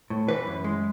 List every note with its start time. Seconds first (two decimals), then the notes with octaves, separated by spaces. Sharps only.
0.10 A2
0.28 E3 B4
0.47 F#2
0.64 G#3